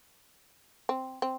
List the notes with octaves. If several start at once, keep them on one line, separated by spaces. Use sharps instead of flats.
C4
C4